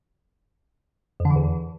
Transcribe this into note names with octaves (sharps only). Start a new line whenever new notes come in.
F2
D3
E3
E2